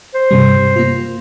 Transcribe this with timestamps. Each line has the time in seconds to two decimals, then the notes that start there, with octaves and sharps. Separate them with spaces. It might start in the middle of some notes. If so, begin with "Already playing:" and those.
0.15 C5
0.31 G2 C3 G3
0.76 A#3 F4